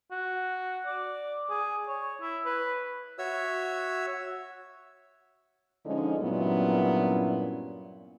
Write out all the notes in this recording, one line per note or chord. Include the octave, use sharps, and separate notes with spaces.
F#4
D5
G#4
C#5
E4
B4
F#4 C#5 E5 E6
D3 F3 G#3 C#4 D#4
G2 A#2 F#3 B3 C#4 E4